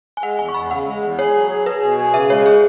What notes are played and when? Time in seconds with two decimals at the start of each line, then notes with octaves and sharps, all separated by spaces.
0.17 G#5
0.22 G#3 F#5
0.38 E2 G#5
0.49 C#6
0.54 E2 B5
0.71 C#3 F#5
0.87 G#3
1.03 E2
1.18 G#4 C#5
1.34 F#3
1.50 G#4
1.66 G#4 B4
1.82 B2
1.98 G#4
2.14 C#3 E5
2.30 G#3 C#5
2.46 G#4